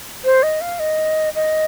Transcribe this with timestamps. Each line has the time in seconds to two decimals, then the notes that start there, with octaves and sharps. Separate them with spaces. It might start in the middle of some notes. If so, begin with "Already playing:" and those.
0.25 C5
0.43 D#5
0.61 F5
0.79 D#5
1.35 D#5